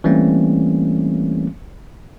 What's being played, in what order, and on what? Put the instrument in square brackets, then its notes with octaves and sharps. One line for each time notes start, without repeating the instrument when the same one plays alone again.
[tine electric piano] E3 G3 A3 A#3 C4 C#4